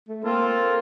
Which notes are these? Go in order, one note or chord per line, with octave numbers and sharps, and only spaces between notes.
A3
A#3 C4 F4 A4 C5